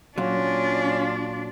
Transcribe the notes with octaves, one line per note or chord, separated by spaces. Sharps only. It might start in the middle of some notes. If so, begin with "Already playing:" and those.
A#2 F#3 C#4 D4 F4